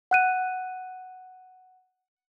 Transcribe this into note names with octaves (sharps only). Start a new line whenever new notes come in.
F#5 F#6 D#7